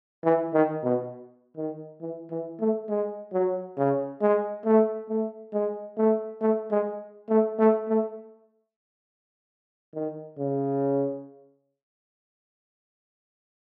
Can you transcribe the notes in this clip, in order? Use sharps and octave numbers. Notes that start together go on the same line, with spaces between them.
E3
D#3
B2
D#3
E3
E3
A3
G#3
F#3
C#3
G#3
A3
A3
G#3
A3
A3
G#3
A3
A3
A3
D#3
C#3